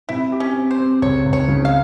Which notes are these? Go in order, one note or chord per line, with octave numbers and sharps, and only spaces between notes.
C3 E4
G4
C#4
C4
C5
C4
C#2 C#5
C#2
C#5
C#3
F5